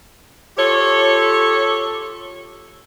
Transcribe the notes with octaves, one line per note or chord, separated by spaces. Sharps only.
F4 G4 A4 C#5